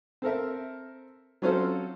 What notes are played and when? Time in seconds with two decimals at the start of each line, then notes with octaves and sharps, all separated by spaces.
0.22 C4 A4 A#4 E5
1.42 F#3 C4 C#4 F4 A4 C5